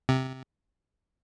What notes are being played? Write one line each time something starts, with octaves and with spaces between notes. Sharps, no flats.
C3